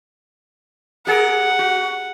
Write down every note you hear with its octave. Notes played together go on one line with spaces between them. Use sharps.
G4 G#4 A#4 F#5
F#4